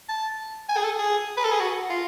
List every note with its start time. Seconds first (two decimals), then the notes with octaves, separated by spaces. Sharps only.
0.09 A5
0.69 G#5
0.77 G#4
0.84 A4
0.99 G#4
1.37 B4
1.45 A4
1.52 G#4
1.60 F#4
1.90 F4